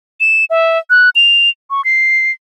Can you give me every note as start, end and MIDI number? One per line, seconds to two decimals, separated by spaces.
0.20 0.45 100
0.50 0.78 76
0.90 1.10 90
1.15 1.50 101
1.70 1.84 85
1.85 2.32 96